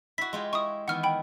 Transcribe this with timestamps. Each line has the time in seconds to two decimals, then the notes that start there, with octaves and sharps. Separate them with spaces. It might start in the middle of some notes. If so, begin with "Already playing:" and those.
0.18 E4 F#4 B6
0.33 G#3 F4 G4
0.53 E4 C#6 D#6
0.88 D#3 E3 B3 F#5 F6
1.03 G5 B5